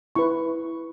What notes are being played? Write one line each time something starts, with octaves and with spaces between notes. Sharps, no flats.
E4 B4 C#6